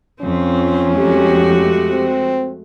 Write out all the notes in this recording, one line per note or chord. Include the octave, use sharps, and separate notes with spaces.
F2 C4 C#4 F4
G#3 A3 F#4 G4
C4